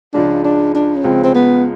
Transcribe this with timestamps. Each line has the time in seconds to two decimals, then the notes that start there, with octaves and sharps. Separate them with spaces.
0.13 C#2 C#3 F3 G#3 D4
0.44 D4
0.75 D4
0.96 C#4
1.04 C#2 C#3 F3 G#3 C4
1.23 C4
1.35 B3